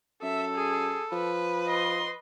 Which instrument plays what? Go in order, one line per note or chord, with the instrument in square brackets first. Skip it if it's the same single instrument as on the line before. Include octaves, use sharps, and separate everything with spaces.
[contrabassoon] F#2 [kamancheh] A4 [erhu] E5
[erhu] G#4
[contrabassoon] F3 [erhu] B4
[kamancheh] D#5 C6